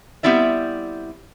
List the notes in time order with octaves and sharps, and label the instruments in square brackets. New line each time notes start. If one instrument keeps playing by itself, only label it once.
[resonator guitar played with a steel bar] G3 B3 C4 E4 D5 E5